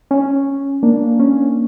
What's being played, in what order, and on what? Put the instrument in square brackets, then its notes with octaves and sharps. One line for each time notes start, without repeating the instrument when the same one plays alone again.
[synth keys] C#4
A#3 D4
C#4